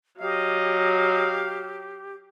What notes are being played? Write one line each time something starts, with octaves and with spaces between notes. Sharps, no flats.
F#3 G4 D#5 F5